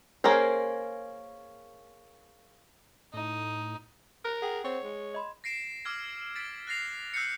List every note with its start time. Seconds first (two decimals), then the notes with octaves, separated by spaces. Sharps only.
0.24 A#3 C#4 G#4 A#4 C5
3.14 A2 D#4
4.25 A#4 F6 F#6
4.42 G#4 F#5 G5
4.64 C4 G#4 C#5
4.84 G#3
5.14 D#5 B5 C6
5.44 A#6 C7 D7 E7
5.85 D6 E6 F6 G#6
6.36 A6 B6 D7
6.67 F#6 A6 A#6 C7 F7
7.14 E6 F#6 G6 A#6 C7 C#7